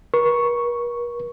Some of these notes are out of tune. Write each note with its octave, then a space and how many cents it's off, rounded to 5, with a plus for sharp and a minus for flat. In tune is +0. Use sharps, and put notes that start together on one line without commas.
A#4 +45 C#6 +0